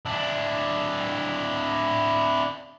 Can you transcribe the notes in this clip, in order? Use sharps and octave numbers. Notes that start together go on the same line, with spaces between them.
D4 E4